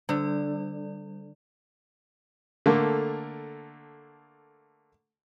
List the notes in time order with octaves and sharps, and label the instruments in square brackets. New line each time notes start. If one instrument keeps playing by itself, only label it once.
[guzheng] D3 [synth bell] G3 D5
[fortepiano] D3 A3 A#3